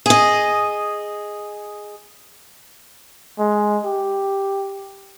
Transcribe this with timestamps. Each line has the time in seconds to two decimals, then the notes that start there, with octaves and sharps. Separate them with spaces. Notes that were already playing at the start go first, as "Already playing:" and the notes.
0.06 G#4 D#5
3.39 G#3
3.85 G4